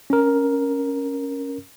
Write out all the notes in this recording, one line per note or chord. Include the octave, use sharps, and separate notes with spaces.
C#4 A#4